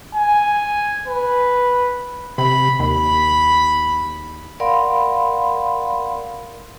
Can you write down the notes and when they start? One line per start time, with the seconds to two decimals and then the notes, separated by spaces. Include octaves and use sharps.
0.15 G#5
1.07 B4
2.38 C3 B5
2.79 D#2 B5
4.60 A#4 D5 F5 F#5 B5 C6